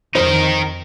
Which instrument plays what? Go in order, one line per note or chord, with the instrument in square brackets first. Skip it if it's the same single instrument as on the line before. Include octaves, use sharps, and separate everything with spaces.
[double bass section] F2 D#3 [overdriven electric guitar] D#4 A#4 [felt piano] C5